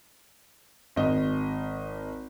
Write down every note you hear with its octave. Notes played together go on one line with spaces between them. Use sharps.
G#1 D#5